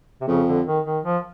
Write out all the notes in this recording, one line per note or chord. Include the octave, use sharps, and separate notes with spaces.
C3
F2 C#3
D3
D#3
D#3
F3